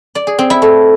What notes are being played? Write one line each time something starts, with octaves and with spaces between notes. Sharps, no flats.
D5
G#4
C4
E4
A3